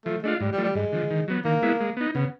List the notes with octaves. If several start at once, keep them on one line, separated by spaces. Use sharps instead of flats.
F3 A3
G#3 A3 D4 F4
G#2 G3
G3
F3 A3
G3
G2 G#3
D3 F3
D#3
F#3 B3
D#3 A#3
G#3 B3 E4
G#3
B3 D#4
C#3 B3